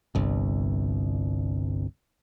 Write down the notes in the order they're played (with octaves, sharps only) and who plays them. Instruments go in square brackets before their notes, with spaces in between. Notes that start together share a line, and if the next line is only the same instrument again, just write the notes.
[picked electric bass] G1 C2